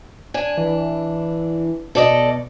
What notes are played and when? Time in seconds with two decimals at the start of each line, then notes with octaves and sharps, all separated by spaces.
0.34 D4 G#5
0.57 E3
1.95 B2 A4 D5 D#5